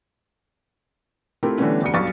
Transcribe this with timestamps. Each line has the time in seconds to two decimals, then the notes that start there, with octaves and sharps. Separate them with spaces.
1.43 A3 C4 E4 F4 G4 A#4
1.58 D3 E3 G3 A3 B3 C#4
1.82 F1 D2 C#7
1.94 B1 G2 F5 C#6 A6